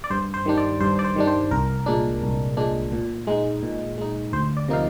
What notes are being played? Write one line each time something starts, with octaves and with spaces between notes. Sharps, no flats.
D5
G2 C5
C5
D#3 G3 D4
D5
G2 C5
D5
C5
D#3 G3 D4
C5
C2 A#4
A#2 G#3 D4
C2
A#2 G#3 D4
A#2
G#3 D#4
A#2
G#3 D#4
D2 C5
D5
C3 F3 A#3 D#4 F5